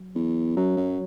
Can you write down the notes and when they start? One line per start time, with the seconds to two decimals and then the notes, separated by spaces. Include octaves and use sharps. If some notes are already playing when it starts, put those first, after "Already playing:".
Already playing: F#3
0.15 E2
0.57 F#2 F#3
0.77 F#2